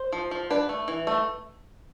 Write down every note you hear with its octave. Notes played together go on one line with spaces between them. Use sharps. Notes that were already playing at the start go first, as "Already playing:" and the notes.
Already playing: C5
F3
F3
D4 B4
A3
E3
A3